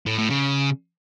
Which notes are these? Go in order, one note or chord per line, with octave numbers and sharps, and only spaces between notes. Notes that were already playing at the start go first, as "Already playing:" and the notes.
A2
A2
C#3